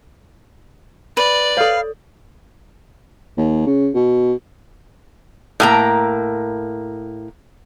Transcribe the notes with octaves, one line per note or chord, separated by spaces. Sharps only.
B4 D5
A4 C#5 F5
D#2
C#3
B2
A2 A#3 A#5